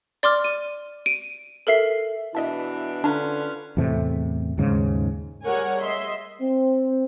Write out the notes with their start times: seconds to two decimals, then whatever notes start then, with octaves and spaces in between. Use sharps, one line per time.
0.23 D5 C6 D6 F6
0.44 D#7
1.06 D7 D#7
1.67 A4 A#4 E5 C7
2.35 B2 E3 D4 E4 D#5 E5 A5
3.04 D3 C#4 D4 F4 B4 A#5
3.77 E2 A2 C3 A3
4.58 D#2 G#2 C#3
5.44 G3 G#4 A#4 C#5 F#5 G#5
5.81 D#5 E5 C6
6.41 C4